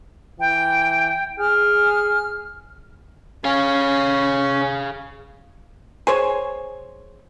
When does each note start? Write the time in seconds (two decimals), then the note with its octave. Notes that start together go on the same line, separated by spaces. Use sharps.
0.40 E3 G5
1.39 G#4 F6
3.44 C#4 G#4 F5
6.07 G#4 C5 C#5